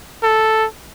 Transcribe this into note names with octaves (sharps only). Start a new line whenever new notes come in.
A4